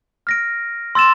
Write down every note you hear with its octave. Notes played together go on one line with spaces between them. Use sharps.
F6 A#6 D7
C6 E6 A6 E7